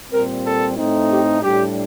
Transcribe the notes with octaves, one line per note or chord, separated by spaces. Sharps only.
A#2 G3 C4 A#4
A4
A2 A3 C4 D#4
G4
A2 G3 D4 G4